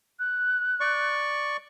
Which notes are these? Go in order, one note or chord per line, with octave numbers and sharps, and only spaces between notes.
F#6
D5 C#6